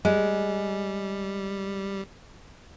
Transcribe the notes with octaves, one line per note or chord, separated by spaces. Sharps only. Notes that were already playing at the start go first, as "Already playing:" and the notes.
G3 G#3